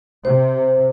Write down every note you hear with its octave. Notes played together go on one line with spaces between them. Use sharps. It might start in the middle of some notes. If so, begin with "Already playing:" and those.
C3 C5